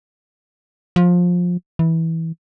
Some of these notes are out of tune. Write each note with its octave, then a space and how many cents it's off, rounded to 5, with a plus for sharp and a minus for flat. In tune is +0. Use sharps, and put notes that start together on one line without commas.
F3 +20
E3 -15